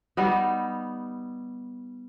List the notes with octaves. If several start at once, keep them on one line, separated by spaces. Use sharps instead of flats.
G3 B3 D#4